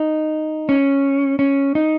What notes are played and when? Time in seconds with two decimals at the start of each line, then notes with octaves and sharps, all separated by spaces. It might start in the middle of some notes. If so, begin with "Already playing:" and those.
Already playing: D#4
0.69 C#4
1.39 C#4
1.75 D#4